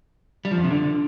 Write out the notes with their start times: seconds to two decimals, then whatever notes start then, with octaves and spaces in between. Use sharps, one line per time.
0.45 G3
0.51 F3
0.58 F2
0.64 C3
0.70 D3